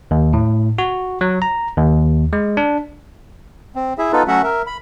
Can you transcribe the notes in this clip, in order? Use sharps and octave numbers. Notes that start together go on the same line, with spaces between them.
D#2
A2
F#4
F#3
A#5
D#2
G#3
D4
C4
E4 G#4 E5
B3 D#4 F4 A4 B4
F#3 A3 C#4 F#4 E5 F#5
A#4 E5
B5